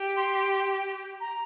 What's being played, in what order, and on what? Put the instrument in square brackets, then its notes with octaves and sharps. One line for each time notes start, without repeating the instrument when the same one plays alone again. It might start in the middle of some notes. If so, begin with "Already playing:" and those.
Already playing: [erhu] G4
[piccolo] C6
A#5